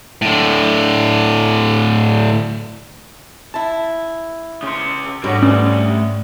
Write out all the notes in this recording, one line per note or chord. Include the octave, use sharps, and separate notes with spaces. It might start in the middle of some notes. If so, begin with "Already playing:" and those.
A2 D3
E4 A5
C#3 C6
G#2 D3 G3 F#4 C#5 F#5
A3 C#4 B4 D5